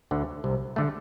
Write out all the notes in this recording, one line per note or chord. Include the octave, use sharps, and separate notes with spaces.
D2 D3
C2 C3
D3 A3